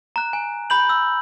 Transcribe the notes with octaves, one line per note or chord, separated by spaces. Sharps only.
A#5 F#6
G#5
B5 G6 F#7
E6